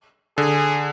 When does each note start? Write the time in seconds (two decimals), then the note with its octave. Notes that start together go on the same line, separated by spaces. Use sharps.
0.38 D3 G#4